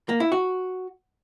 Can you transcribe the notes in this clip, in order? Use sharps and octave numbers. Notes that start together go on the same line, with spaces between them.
A#3
E4
F#4